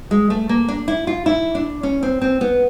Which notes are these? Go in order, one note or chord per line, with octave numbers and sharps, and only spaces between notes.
G#3
A3
A#3
D4
E4
F4
E4
D4
C#4
C4
C4
B3